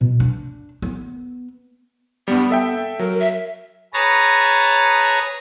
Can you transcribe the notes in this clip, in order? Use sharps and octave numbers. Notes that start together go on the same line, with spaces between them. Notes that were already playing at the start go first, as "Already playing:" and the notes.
B2
D4
B3
G2 G3 B3
A4 E5 G5
F#3 A#4
E5
G#4 B4 C#5 A5 A#5